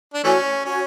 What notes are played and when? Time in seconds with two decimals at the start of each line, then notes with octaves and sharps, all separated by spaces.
0.14 D4
0.24 E3 A3 C#4 F#4 C#5 G#5
0.65 C#4 F#4 C#5 G#5